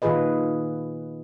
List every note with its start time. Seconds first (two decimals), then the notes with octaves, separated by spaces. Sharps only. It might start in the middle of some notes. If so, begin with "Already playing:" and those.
0.02 A#2 D#3 F4 G#4 B4 D#5